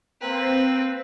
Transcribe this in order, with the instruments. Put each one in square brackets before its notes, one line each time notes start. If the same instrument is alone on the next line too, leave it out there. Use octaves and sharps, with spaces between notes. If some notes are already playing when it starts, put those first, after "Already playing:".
[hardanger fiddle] A#3 B4 [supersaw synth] C4